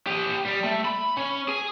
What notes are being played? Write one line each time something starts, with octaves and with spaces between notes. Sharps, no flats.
G4 D#5
G3
A3
B5
C#4
G#4 G#5